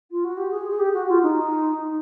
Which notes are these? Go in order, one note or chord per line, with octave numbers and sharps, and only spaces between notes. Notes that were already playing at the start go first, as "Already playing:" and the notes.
F4
F#4
G4
G#4
G#4
G4
F#4
F4
D#4